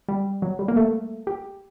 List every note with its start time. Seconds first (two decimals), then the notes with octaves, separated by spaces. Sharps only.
0.09 G3
0.42 F#3
0.59 G3
0.68 A#3
0.76 A3
1.27 G4